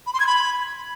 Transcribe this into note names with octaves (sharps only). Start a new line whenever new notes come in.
B5
C6
G#6
B5